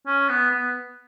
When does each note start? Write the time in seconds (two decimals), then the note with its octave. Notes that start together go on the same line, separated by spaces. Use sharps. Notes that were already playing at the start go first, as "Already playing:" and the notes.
0.07 C#4
0.29 B3
0.50 B3